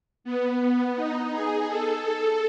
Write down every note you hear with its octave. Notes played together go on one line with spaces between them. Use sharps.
B3
B3
D#4
G#4
A4
A4